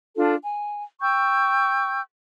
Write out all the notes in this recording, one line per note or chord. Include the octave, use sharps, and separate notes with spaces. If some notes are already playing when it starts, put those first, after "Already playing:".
D4 F4 A4
G#5
G5 C#6 E6 G6